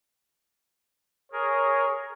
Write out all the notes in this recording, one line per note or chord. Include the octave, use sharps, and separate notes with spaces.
G#4 A#4 C#5